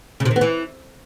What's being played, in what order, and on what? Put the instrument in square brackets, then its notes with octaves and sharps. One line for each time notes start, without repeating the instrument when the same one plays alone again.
[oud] C#3
C3
D#3
B3
E3